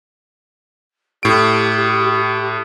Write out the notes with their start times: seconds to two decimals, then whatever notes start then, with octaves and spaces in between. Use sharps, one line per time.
1.23 A2 G4 D7
2.14 G4